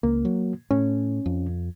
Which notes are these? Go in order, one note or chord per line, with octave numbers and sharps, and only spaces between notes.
C#2 A#3
F#3
A2 C#4
F2